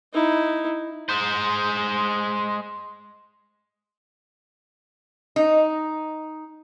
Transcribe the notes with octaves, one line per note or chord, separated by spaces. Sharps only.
D#4 E4
G#3 C5
D#4